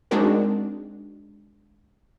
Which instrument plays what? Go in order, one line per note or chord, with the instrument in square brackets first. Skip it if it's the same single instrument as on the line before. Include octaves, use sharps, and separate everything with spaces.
[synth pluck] G#3 C4 D4 D#4 F#4 A#4